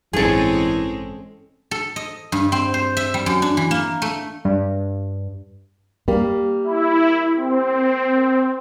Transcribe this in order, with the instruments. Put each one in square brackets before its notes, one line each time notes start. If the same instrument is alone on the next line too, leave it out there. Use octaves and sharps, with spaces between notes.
[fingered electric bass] A1 G2 [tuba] E3 [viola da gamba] G#3 C4 C#4 [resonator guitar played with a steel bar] G#4 A4
[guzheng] A4
D#5
G2
C4
C5
E5
G3
F#2
D4
E3
A#3
A3
[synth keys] G2
[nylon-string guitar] G3 A#3 G4
[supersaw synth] E4
C4